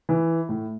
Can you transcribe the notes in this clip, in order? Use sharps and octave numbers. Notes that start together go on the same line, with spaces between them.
E3
A2